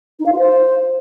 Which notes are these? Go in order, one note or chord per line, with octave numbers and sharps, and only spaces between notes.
D#4
F5
F4
C5